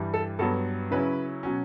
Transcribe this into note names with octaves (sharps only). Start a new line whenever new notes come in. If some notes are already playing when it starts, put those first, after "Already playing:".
Already playing: G2 E3 G3
A4
G2 F#3 B3 A4
C#3 F#3 C#4 E4 B4
B2 F#3 C#4